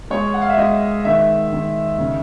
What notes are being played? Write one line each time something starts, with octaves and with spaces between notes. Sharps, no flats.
G#3 C#5
F#5
F5
E5
G#3 D#5
D#3 E5
D#3
C#3